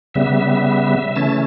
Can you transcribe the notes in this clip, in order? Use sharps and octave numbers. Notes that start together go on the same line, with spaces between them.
C#3 G3 B3 E5
C#3 E3 A3 C#4 A5